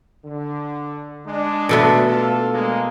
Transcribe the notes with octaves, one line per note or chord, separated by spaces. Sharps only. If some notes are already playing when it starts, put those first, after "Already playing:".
D3
G#3 D4
B2 A3 B3
D4 F4 A4
G#3 A#3